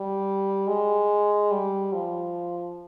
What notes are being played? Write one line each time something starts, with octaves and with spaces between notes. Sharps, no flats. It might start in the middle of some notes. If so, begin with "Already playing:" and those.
Already playing: G3
G#3
G3
F3